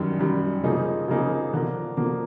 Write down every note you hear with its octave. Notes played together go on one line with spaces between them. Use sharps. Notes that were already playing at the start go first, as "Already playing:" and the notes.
Already playing: F#2 D#3 G3
F#2 D#3 G3
C#3 F3 A#3 D#4 G#4
C#3 F3 A#3 D#4 G#4
D3 F3 A#3
D3 F3 A#3